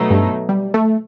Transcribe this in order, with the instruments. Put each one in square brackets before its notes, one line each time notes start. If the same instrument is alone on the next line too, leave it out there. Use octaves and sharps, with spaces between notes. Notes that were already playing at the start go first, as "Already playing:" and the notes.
Already playing: [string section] B2 F#3 A3 D#4
[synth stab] G2
G3
A3